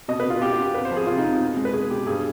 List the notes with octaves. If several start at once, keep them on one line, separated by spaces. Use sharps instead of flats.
B2 D#5
B4
B2
F4
B3 G4
F4
B3
G4
F2 B4
C5
F3
G#4
C3 F4
D#4
F2
B2
G#3
B4
B2 G#4
B2 G4
G2 G#4